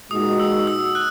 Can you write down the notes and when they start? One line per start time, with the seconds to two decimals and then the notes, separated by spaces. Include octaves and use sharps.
0.11 A#2 G#3 D#4 F#4 D#6
0.39 E6
0.67 E6
0.95 F#6